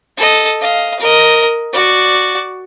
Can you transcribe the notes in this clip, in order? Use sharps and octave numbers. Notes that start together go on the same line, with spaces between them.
A4 D#5
D#5 F5
A#4 D#5
F#4 D5